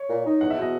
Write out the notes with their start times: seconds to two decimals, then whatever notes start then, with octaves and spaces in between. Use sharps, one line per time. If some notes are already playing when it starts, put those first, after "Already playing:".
Already playing: C#5
0.09 A#2
0.25 D#4
0.41 E2 F#5
0.50 E5
0.56 B2
0.62 D#5